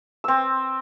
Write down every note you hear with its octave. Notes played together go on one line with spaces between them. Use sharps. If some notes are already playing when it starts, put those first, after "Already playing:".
C4 E6